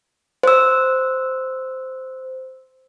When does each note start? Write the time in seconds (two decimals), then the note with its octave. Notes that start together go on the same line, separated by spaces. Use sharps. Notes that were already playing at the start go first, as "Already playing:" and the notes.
0.43 C5 E6